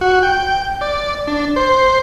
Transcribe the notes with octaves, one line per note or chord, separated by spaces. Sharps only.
F#4
G5
D5
D4
C5